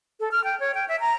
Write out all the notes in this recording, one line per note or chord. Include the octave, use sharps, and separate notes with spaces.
A4
F6
G5
C#5
G5
E5
A#5